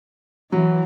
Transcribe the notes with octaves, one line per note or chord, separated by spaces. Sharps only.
E3 F#3